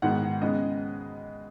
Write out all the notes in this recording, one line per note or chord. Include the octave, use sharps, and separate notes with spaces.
G#2 D#3 G#3 B3 F#5
C#3 G#3 B3 D#5